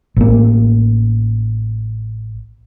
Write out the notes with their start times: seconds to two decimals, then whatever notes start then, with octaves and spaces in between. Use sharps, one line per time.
0.17 A1 A#3